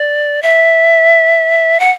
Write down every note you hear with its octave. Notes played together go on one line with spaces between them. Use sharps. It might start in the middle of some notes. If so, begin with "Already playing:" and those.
Already playing: D5
E5
F#5